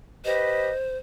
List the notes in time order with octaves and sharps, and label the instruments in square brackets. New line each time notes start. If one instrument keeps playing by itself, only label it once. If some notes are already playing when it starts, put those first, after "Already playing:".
[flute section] G4 B4 D#5 [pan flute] C5